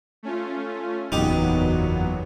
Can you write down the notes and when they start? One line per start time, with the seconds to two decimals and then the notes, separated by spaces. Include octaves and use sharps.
0.23 A3 C#4 F4
1.12 F#1 E2 A#2 F#3 B3 D#4 G4